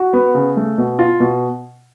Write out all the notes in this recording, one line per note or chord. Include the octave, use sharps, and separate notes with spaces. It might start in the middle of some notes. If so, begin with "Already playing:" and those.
Already playing: F#4
B3
C#3
A3
B2
F4
B2